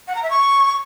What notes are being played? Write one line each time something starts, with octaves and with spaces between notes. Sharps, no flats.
F#5
A#5
E5
C#6